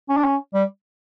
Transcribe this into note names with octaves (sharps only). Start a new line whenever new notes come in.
C#4
D4
C#4
G3